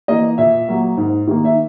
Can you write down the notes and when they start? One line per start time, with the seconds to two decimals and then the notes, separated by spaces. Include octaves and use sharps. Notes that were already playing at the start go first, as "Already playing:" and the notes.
0.08 E3 A#3 D#5
0.38 A#2 E5
0.68 F#3 A#3
0.97 G#2
1.27 D#3 A#3
1.45 E5